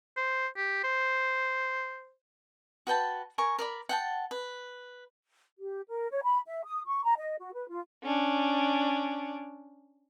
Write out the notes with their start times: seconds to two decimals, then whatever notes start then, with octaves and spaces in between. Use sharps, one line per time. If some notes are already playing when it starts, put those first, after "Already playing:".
0.17 C5
0.57 G4
0.84 C5
2.87 F#4 B4 G5 A5
3.38 A#4 G#5 C#6
3.59 A#4 D5 B5
3.89 F#5 G5 A5
4.31 B4
5.59 G4
5.88 A#4
6.11 C#5
6.23 B5
6.47 E5
6.64 D#6
6.85 C#6
7.04 A#5
7.18 D#5
7.38 F#4
7.53 B4
7.69 F4
8.04 C#4 D4